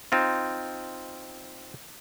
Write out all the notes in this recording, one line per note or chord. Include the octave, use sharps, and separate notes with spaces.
C4 D#4 F4